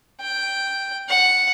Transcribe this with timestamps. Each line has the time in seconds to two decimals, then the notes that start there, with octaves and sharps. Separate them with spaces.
0.20 G5
1.09 F#5